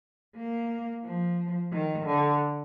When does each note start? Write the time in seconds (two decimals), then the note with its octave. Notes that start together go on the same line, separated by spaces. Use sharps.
0.36 A#3
1.04 F3
1.72 D#3
2.06 D3